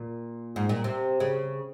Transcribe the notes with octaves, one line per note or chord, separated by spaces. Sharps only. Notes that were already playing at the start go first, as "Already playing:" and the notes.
Already playing: A#2
G#2
A#2
C3
C#3